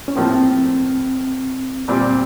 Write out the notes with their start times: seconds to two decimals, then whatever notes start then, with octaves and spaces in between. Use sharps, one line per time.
0.08 C#4
0.16 A2 F3 A#3 C4
1.88 A#2 G3 C4